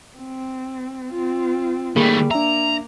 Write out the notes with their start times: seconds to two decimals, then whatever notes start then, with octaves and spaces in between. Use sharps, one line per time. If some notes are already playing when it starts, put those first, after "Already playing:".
0.17 C4
1.11 C4 F4
1.96 D#3 G3 A3 A#3 G#4 B5
2.31 A#3 D4 E5 A#5